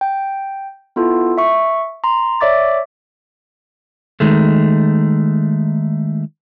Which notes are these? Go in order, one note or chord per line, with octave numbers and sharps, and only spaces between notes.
G5
B3 E4 F4 A4
E5 C#6
A#5 C6
C#5 D5 E5 D6 A6
D#3 G#3 A3